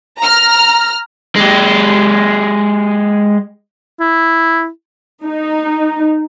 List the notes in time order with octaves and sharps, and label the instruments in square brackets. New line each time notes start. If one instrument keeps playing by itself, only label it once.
[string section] A#5 F6
[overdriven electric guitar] G#3 G4
[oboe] E4
[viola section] D#4